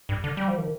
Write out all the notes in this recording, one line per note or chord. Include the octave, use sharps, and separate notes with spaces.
G2
D3
G3
F3
D#3